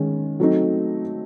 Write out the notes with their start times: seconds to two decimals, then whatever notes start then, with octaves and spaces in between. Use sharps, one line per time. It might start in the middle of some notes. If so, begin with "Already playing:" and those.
Already playing: D#3 G#3 C#4
0.40 F#3 A3 C4 D#4